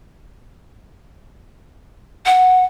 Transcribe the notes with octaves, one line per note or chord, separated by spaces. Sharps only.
F#5